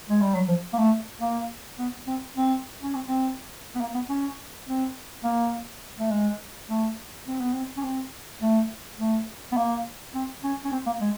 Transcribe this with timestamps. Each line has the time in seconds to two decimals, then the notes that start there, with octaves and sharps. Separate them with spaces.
0.09 G#3
0.21 G3
0.35 F#3
0.49 F3
0.74 A#3
0.78 A3
1.21 A#3
1.79 B3
2.07 C4
2.37 C4
2.83 C#4
2.95 C4
3.08 C4
3.75 B3
3.81 A#3
3.95 B3
4.09 C#4
4.67 C4
5.24 A#3
5.99 A3
6.11 G#3
6.69 A3
7.27 C4
7.40 B3
7.54 C4
7.77 C#4
7.83 C4
8.42 A3
8.99 A3
9.52 B3
9.57 A#3
10.15 C4
10.44 C#4
10.65 C#4
10.72 C4
10.87 A#3
11.01 G#3